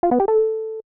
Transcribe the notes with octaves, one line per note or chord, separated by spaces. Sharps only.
F4
B3
G4
A4